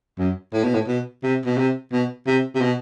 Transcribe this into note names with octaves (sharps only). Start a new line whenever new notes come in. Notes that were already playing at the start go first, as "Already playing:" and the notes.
F#2
A2
B2
A2
B2
C3
B2
C3
B2
C3
C3
B2